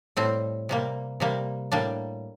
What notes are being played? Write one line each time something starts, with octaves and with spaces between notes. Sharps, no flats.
A2 G3 C4
C3 G3 A#3
C3 G3 A#3
A2 G3 A#3 D4